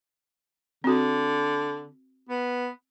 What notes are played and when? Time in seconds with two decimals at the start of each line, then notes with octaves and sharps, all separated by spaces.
0.84 D3 C4 F#4
2.29 B3